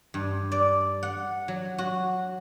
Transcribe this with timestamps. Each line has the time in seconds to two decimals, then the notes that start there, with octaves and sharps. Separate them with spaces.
0.14 G2
0.52 D5
1.03 F#5
1.48 F#3
1.78 F#4